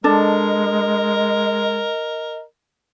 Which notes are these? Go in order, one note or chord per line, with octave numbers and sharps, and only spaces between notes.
G#3 D4 A4 A#4 D#5